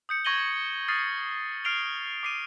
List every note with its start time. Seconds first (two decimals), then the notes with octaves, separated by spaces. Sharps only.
0.09 D#6 G6 C#7
0.25 C#6 G#6 A#6 D#7 F#7 G7
0.88 D#6 F6 A6 C7 D#7
1.64 F6 C7 D7 F7 G7
2.23 D6 C7 D#7